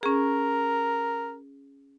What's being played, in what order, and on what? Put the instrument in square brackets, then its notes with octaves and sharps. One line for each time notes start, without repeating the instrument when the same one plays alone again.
[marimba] C#4 G#4 [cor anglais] A#4